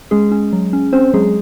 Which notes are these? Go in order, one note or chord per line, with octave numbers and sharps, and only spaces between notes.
G#3 C#4 G#4
C#4
F#3
C#4
C4 C#4 C5
F#3 G#3 G#4